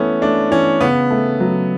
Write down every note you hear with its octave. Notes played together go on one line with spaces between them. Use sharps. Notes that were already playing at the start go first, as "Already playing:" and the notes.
Already playing: E3 A3 B3 C#4
A3 D4
E3 C#4
C#3 B3
A3
F#3